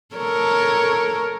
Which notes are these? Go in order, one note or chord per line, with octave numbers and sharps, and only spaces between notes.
A4 A#4 C#5